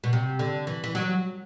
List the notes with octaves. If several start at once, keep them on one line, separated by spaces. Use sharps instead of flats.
B2
C3
D3
E3
E3
F#3